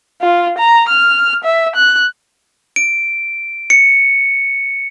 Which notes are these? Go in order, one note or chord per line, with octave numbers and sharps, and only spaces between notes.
F4
A#5
F6
E5
F#6
D7
C#7